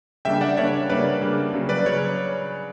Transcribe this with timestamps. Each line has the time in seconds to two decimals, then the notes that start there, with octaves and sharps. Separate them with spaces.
0.25 C#3 G3 A#3 D4 E5 G5
0.41 D5 F#5
0.57 C#3 G3 A#3 D4 C#5 E5
0.89 C#3 G3 A#3 D4 B4 D5
1.21 C#3 G3 A#3 D4
1.54 C#3 F#3 C#4
1.69 B4 D5
1.86 C#3 F#3 C#4 C#5